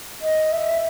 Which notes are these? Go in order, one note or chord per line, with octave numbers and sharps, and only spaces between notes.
D#5
E5